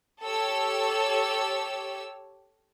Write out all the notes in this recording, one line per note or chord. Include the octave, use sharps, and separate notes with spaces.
G4 A4 C#5 E6